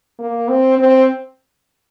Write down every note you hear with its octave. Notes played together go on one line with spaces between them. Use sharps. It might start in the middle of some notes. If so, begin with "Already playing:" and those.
A#3
C4
C4